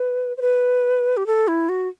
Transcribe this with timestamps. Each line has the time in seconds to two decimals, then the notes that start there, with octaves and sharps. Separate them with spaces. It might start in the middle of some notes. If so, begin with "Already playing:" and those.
Already playing: B4
0.37 C5
0.42 B4
1.17 G4
1.27 A4
1.48 E4
1.69 F#4